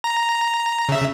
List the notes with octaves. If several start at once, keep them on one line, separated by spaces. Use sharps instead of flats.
A#5
C#3 E5